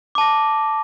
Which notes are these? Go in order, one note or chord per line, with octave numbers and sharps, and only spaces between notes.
A5 D6 A#6